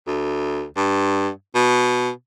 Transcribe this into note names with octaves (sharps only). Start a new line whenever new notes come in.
D2
G2
B2